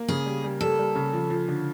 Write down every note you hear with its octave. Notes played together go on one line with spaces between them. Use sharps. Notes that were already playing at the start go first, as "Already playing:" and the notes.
Already playing: A#3
C#3 G#4
G3
G3
G3 A4
G3
C#3
F3
F3
D3